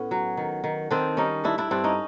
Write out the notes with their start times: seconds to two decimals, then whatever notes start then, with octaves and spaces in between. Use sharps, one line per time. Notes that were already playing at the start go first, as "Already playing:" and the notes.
Already playing: A2 B3 C#4
0.11 F#3
0.37 D#3
0.64 D#3
0.91 D#3 C4 D4
1.17 G3 C#4 D#4
1.44 G2 D4 E4
1.58 D4 E4
1.71 G2 C4 D4
1.84 C#4 D#4